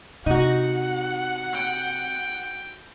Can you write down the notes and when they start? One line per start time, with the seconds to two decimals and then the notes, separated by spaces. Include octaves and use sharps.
0.26 C3 D#4 F#4 F#5
1.53 G5